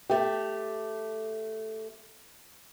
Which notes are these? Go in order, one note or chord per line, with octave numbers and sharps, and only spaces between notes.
A3 G4